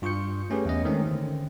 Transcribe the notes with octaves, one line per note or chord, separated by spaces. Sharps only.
G2 F4 C#6 D#6 G6 C#7
A3 C#4 G4 G#4 B4
E2 C#4 D#5
D#3 G#3 A3 C4 C#4
D3 C4